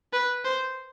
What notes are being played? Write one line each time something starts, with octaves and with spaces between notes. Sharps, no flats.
B4
C5